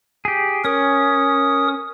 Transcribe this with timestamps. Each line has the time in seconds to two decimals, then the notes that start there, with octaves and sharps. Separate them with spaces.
0.25 G4 G#4
0.65 C#4 A#4 D#6